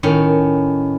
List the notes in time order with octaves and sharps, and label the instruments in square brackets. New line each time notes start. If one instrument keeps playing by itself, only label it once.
[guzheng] A2 D#3 C#4